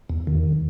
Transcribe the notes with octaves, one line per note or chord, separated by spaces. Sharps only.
E2
D#3